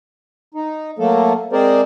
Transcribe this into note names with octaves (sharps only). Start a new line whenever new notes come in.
D#4
F#3 A3 A#3 A4
G#3 C4 G#4 A#4 C5 D5